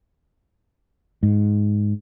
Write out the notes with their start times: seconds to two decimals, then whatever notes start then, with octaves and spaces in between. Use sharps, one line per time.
1.23 G#2